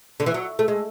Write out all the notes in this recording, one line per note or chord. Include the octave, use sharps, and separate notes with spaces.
D3
E3
F#3
A3
G#3